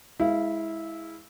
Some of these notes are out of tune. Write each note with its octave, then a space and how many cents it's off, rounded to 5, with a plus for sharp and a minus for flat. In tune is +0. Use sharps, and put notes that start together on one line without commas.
G#3 +0 E4 -15 F5 -35